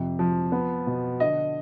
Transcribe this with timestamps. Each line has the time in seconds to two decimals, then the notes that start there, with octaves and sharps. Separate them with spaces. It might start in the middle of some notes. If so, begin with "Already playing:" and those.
Already playing: F2 C3
0.19 F3
0.52 B3
0.87 B2
1.20 D3 D#5